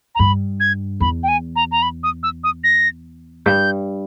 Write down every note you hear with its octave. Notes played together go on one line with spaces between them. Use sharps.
A#5
G2 B5
G#6
E2 B5
G5
G#5
A#5
A#5
B5
D#6
E6
D#6
A#6
G2 G6